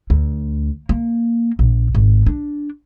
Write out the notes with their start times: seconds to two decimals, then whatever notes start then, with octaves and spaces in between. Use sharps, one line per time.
0.10 D2
0.89 A#3
1.59 A#1
1.95 G#1
2.27 D4